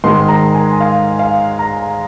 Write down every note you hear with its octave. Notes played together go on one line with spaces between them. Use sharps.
G#2 D#3 G#3 C6
A#5
G#5
F5
F5
A#5